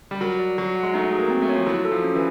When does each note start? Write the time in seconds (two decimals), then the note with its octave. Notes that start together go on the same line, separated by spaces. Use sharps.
0.11 G3
0.21 F#3 A#4
0.39 D5
0.58 F#3 F#4
0.75 F#5
0.83 G#3
0.94 A3 D#4
1.12 G#4
1.18 A#3
1.30 C4
1.42 A3
1.49 C#5
1.55 F3
1.67 F#3 E4
1.85 A4
1.92 F3
2.04 C#4
2.15 E3